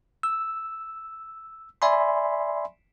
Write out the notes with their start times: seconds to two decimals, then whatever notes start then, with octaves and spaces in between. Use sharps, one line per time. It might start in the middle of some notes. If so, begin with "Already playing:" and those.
0.23 E6
1.82 D5 E5 G#5 B5 C6